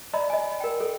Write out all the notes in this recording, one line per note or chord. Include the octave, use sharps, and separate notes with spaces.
D5 D#5 A#5 B5
D#5 G#5
A#4 G5
A4